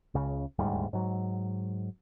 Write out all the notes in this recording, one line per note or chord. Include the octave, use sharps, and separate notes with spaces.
C#2 C#3
D#1 D2 G#2 G3
G#2 F#3